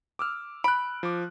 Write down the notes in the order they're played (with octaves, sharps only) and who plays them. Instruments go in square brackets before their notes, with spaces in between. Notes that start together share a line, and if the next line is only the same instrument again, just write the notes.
[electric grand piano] D6 E6 F6
[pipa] B5 [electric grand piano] F#6 D7
[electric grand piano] F3 D6